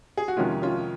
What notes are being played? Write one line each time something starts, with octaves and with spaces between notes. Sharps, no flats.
G#4
F#4
F2 C3 D#3 G#3 C#4 F4
C#4 F4